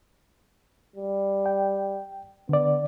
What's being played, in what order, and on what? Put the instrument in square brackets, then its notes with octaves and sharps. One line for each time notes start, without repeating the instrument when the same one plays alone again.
[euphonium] G3
[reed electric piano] G5
[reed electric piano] D3 D5 [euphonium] B3